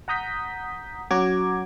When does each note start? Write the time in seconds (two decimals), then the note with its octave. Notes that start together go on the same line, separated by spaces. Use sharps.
0.08 F#5 A#5 D#6 G6 B6
1.11 F#3 C#4 F#4 A#5 D6 G#6